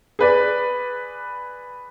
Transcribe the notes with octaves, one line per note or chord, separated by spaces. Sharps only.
G#4 B4 D5